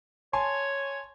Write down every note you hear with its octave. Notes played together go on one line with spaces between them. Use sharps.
C#5 G#5 A5 C6